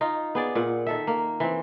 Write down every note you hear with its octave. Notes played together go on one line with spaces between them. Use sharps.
D#4 F4
B3 G#4 D5
A#2 F#5
D#3 A4 E5
A#3
E3 C4